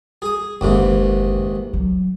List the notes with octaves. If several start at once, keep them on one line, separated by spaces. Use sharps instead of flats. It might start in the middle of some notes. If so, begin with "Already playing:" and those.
G#4 D#6
F#1 D#2 G#2 E3
F#3